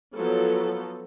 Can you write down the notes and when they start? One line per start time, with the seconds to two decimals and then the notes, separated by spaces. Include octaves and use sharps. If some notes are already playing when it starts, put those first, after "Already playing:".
0.16 F3 F#3 B3 A4